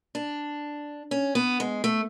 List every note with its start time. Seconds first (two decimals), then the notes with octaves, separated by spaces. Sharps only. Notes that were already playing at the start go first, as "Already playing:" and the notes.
0.15 D4
1.11 C#4
1.35 B3
1.60 G#3
1.84 A3